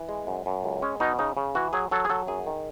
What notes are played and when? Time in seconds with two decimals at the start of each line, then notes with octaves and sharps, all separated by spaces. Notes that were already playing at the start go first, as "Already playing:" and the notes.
Already playing: E3
0.09 G#3
0.27 F#2
0.46 F#2
0.64 C#2
0.82 G#3 C#4
1.00 B2 D#4
1.19 C#3 D#4
1.37 C#3
1.55 E3 F#4
1.73 F#3 G#4
1.91 F#3 A4
2.05 G#4
2.09 F#3 A4
2.27 F#2 G#4
2.47 D#3